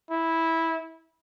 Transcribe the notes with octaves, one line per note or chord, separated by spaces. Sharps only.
E4